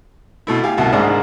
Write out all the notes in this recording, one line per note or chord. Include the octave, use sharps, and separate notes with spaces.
B2 A3 E4
G4 F5 G#5
C2 B2 E5 F#5 A5
G#1 G#2 A#3 D4 G#4 F#5